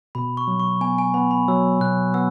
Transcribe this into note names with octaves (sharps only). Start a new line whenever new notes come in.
B2 B5
C#6
F#3
C#6
B3 G#5
G#5
B3 B5
B5
F#3 E6
B2 F#6
B3 E6